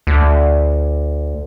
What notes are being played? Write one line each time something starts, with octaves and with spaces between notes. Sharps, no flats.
D2